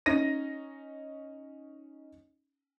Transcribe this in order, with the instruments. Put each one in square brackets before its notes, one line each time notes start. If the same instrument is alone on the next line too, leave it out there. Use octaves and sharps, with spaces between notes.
[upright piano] C#4 D#4 A#6 D#7